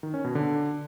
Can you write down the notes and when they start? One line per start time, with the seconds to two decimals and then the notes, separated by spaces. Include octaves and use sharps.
0.03 D#3
0.14 C#4
0.24 B2
0.35 D3